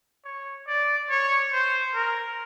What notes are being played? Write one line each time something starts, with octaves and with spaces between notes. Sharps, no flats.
C#5
D5
C#5
C5
A#4